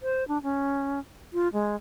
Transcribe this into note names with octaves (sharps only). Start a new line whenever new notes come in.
C5
D4
C#4
F4
G#3